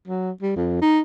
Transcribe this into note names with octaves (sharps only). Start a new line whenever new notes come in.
F#3
G3
F2
D#4